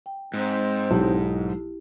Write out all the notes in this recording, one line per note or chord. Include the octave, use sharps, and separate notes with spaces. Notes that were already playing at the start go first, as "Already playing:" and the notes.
G5
G#2 C4
B1 E4 G4